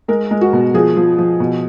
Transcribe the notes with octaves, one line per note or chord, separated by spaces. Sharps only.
G#3 A#4
G#3
F#4
B2
F3 G#4
F3
F3
B2